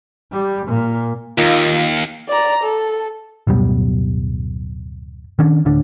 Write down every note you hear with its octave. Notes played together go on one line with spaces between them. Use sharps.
G3
A#2
D#2 A#3 D#4 F4
D5 A#5
A4
D1 F#2 B2 G3
D#3 C#4 D4
D1 A2 D3 D4